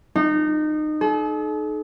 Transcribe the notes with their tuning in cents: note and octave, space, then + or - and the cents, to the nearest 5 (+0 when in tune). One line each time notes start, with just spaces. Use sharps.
D#4 -25
A4 -45